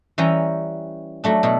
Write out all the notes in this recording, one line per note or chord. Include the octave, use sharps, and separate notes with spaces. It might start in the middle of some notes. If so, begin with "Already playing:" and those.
E3 G3 C#4 G5 A#5
F#3 A3 D4
B2 E4 A4